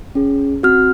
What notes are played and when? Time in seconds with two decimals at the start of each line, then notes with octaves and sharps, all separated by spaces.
0.15 C#4 G#4
0.63 C4 F#4 F6